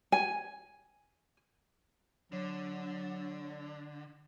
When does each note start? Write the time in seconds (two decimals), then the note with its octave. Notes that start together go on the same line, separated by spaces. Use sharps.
0.12 G#5
2.32 D3 F#3